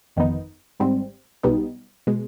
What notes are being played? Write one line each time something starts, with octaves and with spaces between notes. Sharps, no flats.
G1 F2 D#3 B3 D#4
G#1 G#2 G3 C4
B1 B2 G3 B3 D#4
B2 G#3